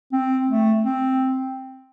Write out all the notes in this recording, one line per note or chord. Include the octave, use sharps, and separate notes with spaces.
C4
A3
C4